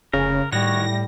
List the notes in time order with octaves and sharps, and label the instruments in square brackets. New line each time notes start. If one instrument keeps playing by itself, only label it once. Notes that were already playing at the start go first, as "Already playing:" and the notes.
[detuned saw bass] F1 [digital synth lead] C#3 [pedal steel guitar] A#4
[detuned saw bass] A2 [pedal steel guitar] D#3 F#4 C#5 [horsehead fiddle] G3 [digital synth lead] A#6